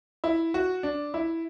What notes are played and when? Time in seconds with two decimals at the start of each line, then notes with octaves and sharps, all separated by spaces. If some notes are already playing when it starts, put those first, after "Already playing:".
0.24 E4
0.54 F#4
0.83 D4
1.14 E4